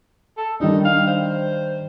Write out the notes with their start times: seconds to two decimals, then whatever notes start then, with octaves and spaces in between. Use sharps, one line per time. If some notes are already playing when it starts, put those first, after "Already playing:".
0.37 A4
0.60 D#3 G3 D4 D#4
0.85 F5
1.07 C5